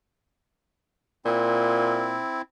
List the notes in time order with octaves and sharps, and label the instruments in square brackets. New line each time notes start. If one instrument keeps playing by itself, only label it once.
[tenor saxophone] A#2 [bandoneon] C4 E4